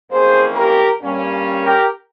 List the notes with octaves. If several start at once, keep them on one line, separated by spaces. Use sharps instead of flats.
F2 E3 A#3 C#4 G#4 C5
G4 A#4
G2 G3 A#3 C#4
G4 A#4